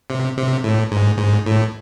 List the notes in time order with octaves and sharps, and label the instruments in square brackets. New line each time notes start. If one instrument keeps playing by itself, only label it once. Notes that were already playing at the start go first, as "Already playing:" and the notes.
[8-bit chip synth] C3
C3
A2
G#2
G#2
A2